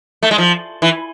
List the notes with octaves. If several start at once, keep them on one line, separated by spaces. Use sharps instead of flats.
A3
G#3
F3
E3